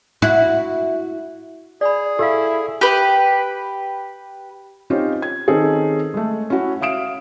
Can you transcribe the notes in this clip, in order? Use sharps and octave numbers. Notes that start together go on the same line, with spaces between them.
E4 F#4
G#4 D5 B5
E4 G4 A4 F5 E6
G4 B4
C4 C#4 D#4 F4 G4 C#5
G#6
D#3 C4 C#4 D#4 G#4 A4
G#3 A3
C#4 E4 F#4
E5 F5 D#6 D7 E7